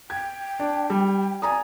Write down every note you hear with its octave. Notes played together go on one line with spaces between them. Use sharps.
G5 G#6
D4
G3
D5 G#5 A#5 D#6